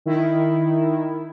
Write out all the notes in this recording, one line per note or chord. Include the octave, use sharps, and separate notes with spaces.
D#3 E4